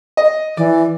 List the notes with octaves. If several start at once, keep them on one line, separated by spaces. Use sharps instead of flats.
D#5
E3 D5